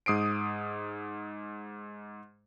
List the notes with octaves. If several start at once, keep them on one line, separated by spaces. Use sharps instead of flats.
G#2 D#6 C7 D7